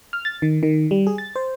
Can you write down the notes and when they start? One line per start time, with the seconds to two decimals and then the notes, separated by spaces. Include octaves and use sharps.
0.13 F6
0.25 A6
0.42 D#3
0.63 D#3
0.91 G3
1.07 G#4
1.18 A6
1.36 C5